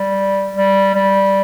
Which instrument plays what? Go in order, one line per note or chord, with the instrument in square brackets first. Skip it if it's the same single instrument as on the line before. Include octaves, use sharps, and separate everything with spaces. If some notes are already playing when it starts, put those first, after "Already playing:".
Already playing: [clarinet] G3
G3
G3